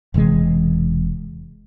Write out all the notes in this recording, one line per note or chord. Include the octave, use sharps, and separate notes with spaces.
E1 C3 E3 G#3